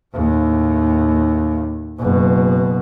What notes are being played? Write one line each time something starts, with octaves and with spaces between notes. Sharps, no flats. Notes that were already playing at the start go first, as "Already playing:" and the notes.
D#2 A2
F#1 B2